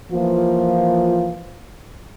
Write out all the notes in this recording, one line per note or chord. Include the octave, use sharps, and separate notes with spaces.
E3 F3 A#3 F4